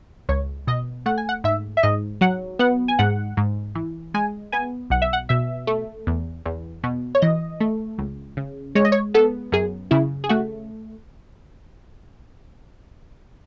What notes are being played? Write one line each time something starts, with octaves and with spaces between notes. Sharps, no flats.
C#2 C#5
B2 D#5
A3 F#5
G#5
F#5
G#2 E5
E5
G#2 D#5
F#3 F#5
B3 F#5
G#5
G#2 F#5
G#2
E3
G#3 G#5
B3 G#5
B1 F#5
E5
F#5
B2 E5
A3
E2
E2
B2
C#5
E3 D#5
A3
C#2
C#3
G#3 C#5
D#5
C#5
B3 A4
F#2 G#4
C#3 E4
G#4
A3 F#4